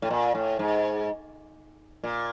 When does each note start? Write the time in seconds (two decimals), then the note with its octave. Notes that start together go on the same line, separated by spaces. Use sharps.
0.02 A2
0.10 A#2
0.35 A2
0.59 G#2
2.03 A#2